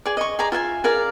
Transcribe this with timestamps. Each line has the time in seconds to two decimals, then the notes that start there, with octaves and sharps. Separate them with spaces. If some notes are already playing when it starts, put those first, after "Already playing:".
0.05 G#4 D5
0.17 D#5 C#6
0.39 G#4 D5 A#5 D6
0.52 F4 E5 G5 G#5
0.84 G#4 A#4 D5 F5